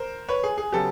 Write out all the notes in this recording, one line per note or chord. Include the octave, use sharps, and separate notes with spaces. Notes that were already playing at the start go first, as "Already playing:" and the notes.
Already playing: A#4 C5
B4 C#5
G#4
G#4
C#3 F#3 B3 G4 A4